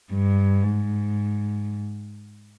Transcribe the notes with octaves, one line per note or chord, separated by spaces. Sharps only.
G2
G#2